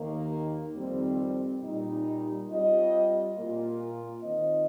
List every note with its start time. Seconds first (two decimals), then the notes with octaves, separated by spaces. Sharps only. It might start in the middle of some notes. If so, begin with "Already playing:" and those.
Already playing: D#2 D#3 A#3
0.74 F2 D#3 G3 C4
1.61 A#2 G3 D#4
2.48 G3 C4 F4 D#5
3.35 A#2 A#3 F4
4.22 D#3 C4 F4 D#5